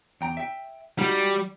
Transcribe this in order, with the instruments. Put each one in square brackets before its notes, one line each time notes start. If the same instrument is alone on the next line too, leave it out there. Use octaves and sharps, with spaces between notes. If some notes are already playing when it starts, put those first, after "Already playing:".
[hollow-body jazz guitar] E2 G5 A#5
E5 G5
[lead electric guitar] G3 [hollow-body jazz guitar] D#4 F#4